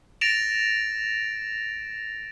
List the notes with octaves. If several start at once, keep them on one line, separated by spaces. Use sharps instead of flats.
A6 A#6 D7 E7 F7